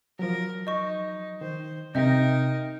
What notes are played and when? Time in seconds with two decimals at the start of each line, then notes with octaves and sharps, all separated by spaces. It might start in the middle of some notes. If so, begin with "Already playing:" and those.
0.19 F3 F#3 A#4
0.67 D#4 D#5 C#6
1.41 D#3 C5
1.95 C3 D#4 A#4 D#5 E5 G5 G6